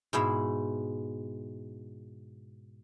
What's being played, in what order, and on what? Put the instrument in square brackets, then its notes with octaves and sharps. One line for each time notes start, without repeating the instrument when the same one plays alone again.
[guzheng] G#2 B2 E4